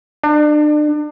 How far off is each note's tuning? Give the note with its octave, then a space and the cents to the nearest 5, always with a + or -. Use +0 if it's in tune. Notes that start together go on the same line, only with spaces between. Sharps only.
D4 +35